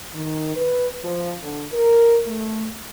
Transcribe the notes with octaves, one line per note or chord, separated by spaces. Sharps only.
D#3
B4
F3
D3
A#4
A3